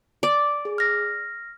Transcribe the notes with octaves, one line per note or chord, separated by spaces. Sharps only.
D5
G#4
F6 A#6